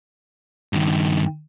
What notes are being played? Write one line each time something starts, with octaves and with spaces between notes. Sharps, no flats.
G2 D#3